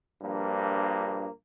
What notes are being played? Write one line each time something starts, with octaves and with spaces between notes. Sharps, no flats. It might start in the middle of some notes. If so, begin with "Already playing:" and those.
A#1 G2 F3 A#3